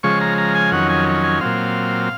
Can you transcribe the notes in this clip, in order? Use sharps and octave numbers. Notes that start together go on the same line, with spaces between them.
C#3 F3 G#3 C#6
A#5
A#5
G#5
F2 D#3 F#3 C#4 F#5
G#5
G#5
A#2 F#3 C4 F5